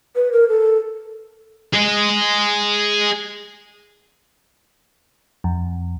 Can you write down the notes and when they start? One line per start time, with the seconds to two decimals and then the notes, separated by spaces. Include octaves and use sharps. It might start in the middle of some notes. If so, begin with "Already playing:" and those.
0.16 B4
0.32 A#4
0.49 A4
1.73 G#4 D#5
5.44 F2